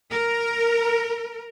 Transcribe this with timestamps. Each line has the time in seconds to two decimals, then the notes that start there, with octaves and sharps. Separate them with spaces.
0.12 A#4